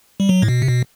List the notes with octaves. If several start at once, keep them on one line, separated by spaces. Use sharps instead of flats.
G3
F#3
A2
B2
C3
B2